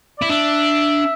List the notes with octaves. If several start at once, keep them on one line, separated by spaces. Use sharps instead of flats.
E4 D5
D4 E5